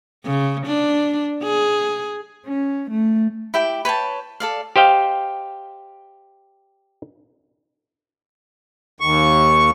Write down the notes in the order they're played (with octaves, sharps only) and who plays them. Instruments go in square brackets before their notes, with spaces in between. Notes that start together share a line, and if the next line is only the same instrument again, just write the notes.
[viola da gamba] C#3
D4
G#4
[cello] C#4
A3
[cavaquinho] E4 G4 G5
B4 C#5 G5 A5
A4 D5 F5
[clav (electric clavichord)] G4 C5 D#5 F5 G5
[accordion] D#2 C#6